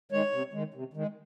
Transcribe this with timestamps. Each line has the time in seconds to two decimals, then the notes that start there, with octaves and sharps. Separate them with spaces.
0.12 D#3 G#3 C#5
0.32 C3
0.53 D#3 G#3
0.74 C3
0.94 D#3 G#3